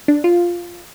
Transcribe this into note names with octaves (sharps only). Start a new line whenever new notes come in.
D4
F4